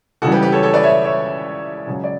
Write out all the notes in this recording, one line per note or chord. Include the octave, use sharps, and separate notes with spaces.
C#2 C#3 E3 G3 F#4 A4
G4 B4
G4 B4
A4 C#5
A4 C#5
B4 D5
C#5 E5
C#5 E5
C#2 C#3 F#3
D5